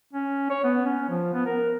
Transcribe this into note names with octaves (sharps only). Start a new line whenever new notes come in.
C#4
C#5
B3
C#4
F3
B3
A#4